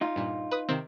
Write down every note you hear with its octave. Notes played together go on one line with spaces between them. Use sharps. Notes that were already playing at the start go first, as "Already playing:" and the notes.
D#4 F4
G2 A#2
B4 D#6
C3 D#3 C4